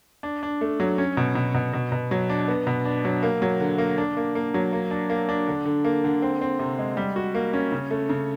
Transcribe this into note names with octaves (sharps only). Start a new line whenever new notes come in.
D4
D4
A3
F#3
C#4
B2
B2
B2
B2
B2
F#3
D4
B3
B2
D4
F#3
A#3
F#3
D3
A#3
D4
A#3
A#3
F#3
A#3
D4
A#3
D4
D3
D3
A#3
D3
C4
C4
C3
G#3
G3
F#4
A#3
C#4
C#3
A3
C#3